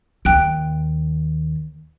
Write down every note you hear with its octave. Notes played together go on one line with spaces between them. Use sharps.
D#2 G5 F#6 D7